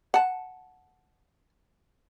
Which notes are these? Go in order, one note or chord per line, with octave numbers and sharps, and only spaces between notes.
F#5 A5